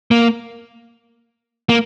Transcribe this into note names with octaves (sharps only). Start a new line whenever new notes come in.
A#3
A#3